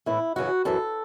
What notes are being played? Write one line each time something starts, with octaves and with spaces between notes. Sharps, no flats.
A2 E3 E4
F#2 C#3 E3 F#4
F#2 E3 A4